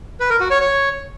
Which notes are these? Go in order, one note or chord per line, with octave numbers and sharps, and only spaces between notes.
B4
A#4
F#4
C#5
C#5